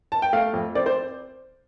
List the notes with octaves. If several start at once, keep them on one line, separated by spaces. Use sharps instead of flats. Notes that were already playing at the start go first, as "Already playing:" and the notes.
A5
G5
A3 F5
F2
C4 D5
C5